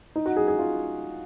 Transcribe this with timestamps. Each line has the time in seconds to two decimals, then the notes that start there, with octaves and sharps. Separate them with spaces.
0.16 D#4
0.26 F#4
0.36 G#4
0.48 G#4
0.59 F4